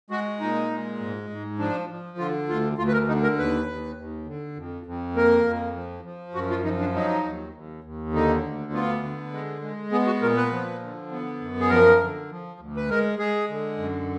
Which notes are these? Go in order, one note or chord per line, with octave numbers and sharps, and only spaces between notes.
G#3 F#4
A#2 D#4
G#3
G#2
G#2
F3 D4
F3
D3 F4
D2 F4
D2 F4
B4
A#4
D3 D#4
A#4
D#2 B4
D#2
D#2
D3
F2
F2
A#3 A#4
F2
F3
F3
F#2 F#4
F4
F3 D#4
D4
F#3 D#4
D#2
D#2
D#2
D3 D#4
D2
B3 F4
D3
G#3
G#3
B3 G#4
F#4
A#2 A#4
B4
F3
D3
B3
F#2
G#4
F3 A#4
D3
F3
D2
B4
G#3 A#4
G#3 G#4
D3
F#2